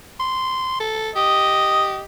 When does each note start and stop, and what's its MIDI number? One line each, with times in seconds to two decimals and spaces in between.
0.20 0.78 84
0.80 1.10 69
1.16 2.05 67
1.16 2.00 75